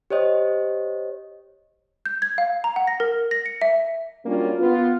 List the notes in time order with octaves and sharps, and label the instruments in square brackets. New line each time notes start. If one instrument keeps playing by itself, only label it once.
[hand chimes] G4 C5 C#5 D#5
[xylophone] G6
G#6
F5
A#5
F#5
A#6
A#4
A#6
C#7
E5
[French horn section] F#3 G3 A#3 C#4 D4 F4
B3 F4